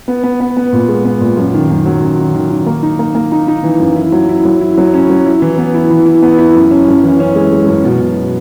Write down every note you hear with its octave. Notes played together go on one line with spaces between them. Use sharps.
B3
B3
B3
B3
A#2
G#3
B3
A#2
F#2
D#3
F#2
F#3
F#2
D#3
D#3
D#3
A#3
D#4
A#3
A#3
D#4
D#4
E3
F#2
E4
F#3
E4
F#3
E4
F#3
C#4
F#3
E4
E3
B3
E4
E3
E4
B3
E4
F#2
C#4
F#2
E3
C#4
G#3
G#3
F#2
B2
B2